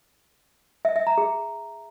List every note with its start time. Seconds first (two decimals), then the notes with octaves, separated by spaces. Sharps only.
0.85 E5
0.96 E5
1.07 A#5
1.18 G#4